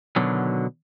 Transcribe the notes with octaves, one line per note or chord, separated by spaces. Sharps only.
B2 D3 D#3 F#3